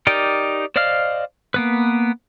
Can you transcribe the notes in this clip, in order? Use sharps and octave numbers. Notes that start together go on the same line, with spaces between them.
D#4 G4 A#4 D5 G5
C5 D5 D#5 F5 F6
A#3 B3 B4